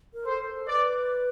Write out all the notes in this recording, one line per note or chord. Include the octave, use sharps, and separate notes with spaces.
A#4
A4 C5
B4 D5